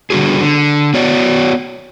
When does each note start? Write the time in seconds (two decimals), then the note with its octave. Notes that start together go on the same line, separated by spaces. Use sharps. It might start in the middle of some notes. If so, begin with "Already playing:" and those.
0.10 D3 G3 F#4 G#4
0.41 D3
0.94 B3 F#4 C#5 D5